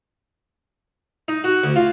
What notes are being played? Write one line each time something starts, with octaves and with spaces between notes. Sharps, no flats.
D#4
F#4
D2
F4